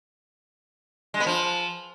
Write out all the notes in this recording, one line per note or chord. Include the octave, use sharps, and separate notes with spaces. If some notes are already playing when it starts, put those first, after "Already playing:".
G#3
B3
F3